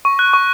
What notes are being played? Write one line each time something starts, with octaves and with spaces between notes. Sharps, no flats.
C#6
F#6
C#6